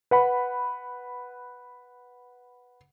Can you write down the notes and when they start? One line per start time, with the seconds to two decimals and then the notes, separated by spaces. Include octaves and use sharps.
0.11 B4 F#5 B5